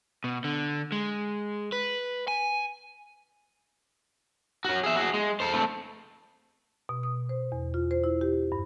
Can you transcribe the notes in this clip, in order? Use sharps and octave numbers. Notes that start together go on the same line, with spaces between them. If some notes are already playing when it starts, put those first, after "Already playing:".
B2
D3
G#3
B4
G#5
C#4 F#4
G#4 E5
F#4 G#4
G#3
A4 C5
A3 C4
B2
D#6
C5
E2
F4
C5
E4
G4
G2